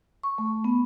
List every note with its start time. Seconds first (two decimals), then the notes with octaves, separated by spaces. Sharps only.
0.23 C#6
0.38 A3
0.64 B3